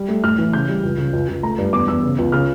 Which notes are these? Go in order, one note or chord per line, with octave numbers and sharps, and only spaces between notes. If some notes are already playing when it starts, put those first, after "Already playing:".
Already playing: G3
A3
A2 F6
E3
C#3 G6
G3
C#2
C#3
C#2
C#2
A3 A#5
G2
E2 D6
E2 E6
C#3
C#2
C#3 F6